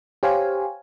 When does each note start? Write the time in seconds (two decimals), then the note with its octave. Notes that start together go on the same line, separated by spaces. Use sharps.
0.23 G4 C5 C#5 F5 G#5